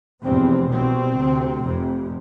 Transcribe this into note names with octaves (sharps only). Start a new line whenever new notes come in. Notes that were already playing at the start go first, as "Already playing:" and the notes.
F1 E2 C3 C4
B2 C4
C2
D2 C3
F1 F2 C3